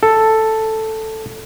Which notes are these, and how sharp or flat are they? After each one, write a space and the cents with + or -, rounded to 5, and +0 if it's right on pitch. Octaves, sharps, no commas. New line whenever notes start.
A4 +5